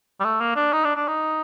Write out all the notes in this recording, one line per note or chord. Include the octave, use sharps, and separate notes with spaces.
G3
A3
A#3
D4
D#4
D4
D4
D#4